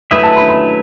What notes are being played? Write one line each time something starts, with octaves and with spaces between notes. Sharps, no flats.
F#3 A3 E4 B4 E5 D#6
A5
B5
B5